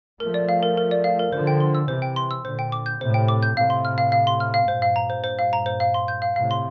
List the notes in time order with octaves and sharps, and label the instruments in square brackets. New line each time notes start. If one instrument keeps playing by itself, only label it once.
[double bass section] F3 A3 [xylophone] A#4
[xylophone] D5
F5
A#4
A#4
D5
F5
A#4
[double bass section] D3 F3 [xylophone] C5
[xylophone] G5
C6
E6
[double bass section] C3 E3 [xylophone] C5
[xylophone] G5
C6
E6
[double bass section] A#2 D3 [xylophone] C5
[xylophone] G5
D6
G6
[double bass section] A2 C3 [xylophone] C5
[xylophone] G5
D6
G6
[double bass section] A2 C3 [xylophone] F5
[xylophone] C6
F6
F5
F5
C6
F6
F5
[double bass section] G2 A#2 [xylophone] C5
[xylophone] F5
A#5
C5
C5
F5
A#5
C5
F5
C6
G6
F5
[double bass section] A2 C3 [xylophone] F5
[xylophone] C6